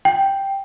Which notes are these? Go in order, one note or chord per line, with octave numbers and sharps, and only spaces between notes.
G5